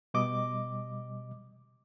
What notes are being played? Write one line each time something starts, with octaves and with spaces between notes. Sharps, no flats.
B2 G3 D#5 D6